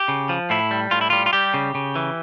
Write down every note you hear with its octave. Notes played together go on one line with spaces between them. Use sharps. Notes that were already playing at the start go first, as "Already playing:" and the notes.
Already playing: G4
C#3
F3
A2 E4
G3
A2 F4
E4
G3 F4
F4
G3 G4
C#3
C#3
E3